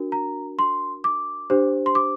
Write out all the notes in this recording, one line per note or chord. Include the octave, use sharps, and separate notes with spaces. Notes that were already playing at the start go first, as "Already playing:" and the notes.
Already playing: D4 F#4 A#4
A#5
C6
D6
D4 G4 C5
C6
D6